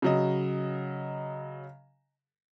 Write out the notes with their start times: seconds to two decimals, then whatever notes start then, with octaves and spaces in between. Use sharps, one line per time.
0.02 C#3 F#3 D#5